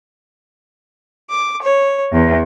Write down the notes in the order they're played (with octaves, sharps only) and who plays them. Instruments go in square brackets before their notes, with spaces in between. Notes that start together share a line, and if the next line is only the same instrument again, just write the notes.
[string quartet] D6
C#5
E2